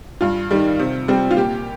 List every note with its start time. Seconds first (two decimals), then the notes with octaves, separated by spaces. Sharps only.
0.21 G2 F4
0.51 D#3 G3
0.79 C3
1.08 G3 C4
1.31 F4
1.37 A#2 G4